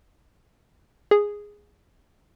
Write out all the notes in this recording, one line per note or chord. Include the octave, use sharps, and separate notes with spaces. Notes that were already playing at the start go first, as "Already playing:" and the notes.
G#4